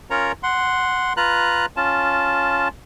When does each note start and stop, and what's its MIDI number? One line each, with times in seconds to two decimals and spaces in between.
0.10 0.32 61
0.10 0.32 65
0.10 0.32 70
0.10 0.32 73
0.10 0.32 82
0.43 1.13 78
0.43 1.13 84
1.17 1.66 65
1.17 1.66 71
1.17 1.66 82
1.17 1.66 90
1.77 2.68 61
1.77 2.68 65
1.77 2.68 81